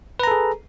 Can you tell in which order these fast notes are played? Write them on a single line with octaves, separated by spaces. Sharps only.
B4 A#5 A4 G#4